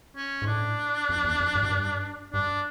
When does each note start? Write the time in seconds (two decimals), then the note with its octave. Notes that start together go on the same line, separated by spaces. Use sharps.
0.16 C#4
0.42 G#2
0.47 A2 D4
1.09 F2
1.24 E2
1.40 F2
1.55 G2
1.63 F#2
1.71 G2
2.33 G2 D4